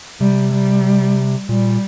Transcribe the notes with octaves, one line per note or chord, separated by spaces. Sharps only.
C3 G3
G3
A#2 G3